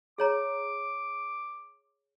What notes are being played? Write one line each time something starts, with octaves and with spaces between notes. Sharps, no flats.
G#4 C#5 A#5 D6